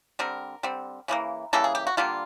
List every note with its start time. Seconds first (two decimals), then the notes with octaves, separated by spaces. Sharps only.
0.19 D3 G3 C4 A#4
0.63 D3 G3 C4
1.08 C#3 E3 G3 A#3
1.53 C#3 E3 G3 A#3 A4
1.64 G#4
1.75 G4
1.87 F#4
1.97 D3 G3 A#3 F4